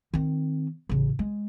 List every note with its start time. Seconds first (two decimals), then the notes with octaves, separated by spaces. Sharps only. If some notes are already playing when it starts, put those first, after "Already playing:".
0.14 D#3 C4
0.89 A1 C#3
1.19 G#3